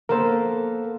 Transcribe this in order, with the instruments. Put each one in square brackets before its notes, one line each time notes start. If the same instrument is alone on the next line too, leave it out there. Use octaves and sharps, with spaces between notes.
[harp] A#3 B3 A4 [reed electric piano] A#4 C5